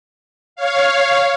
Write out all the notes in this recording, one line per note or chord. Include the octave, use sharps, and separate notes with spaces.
C#5 F5